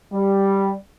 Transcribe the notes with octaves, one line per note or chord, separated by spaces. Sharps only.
G3